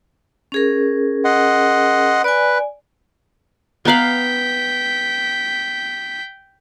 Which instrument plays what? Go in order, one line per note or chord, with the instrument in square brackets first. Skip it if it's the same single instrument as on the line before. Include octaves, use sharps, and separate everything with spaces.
[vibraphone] C#4 G#4 A#4
[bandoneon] D#5 F#5 C6
[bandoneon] B4 [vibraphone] D5 G#5
[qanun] B3 F5 [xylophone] B4 A#5 F#7 [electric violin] G5 B6